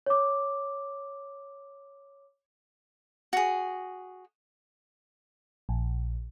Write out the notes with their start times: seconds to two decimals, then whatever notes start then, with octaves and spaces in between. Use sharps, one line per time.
0.06 C#5 D6
3.33 F#4 G#4
5.69 A#1